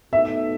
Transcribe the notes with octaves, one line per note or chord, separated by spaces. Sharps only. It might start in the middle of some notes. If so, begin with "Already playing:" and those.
B2 A3 D#4 F#4 A4 E5